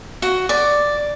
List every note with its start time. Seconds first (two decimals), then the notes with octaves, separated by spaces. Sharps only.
0.22 F#4
0.49 D5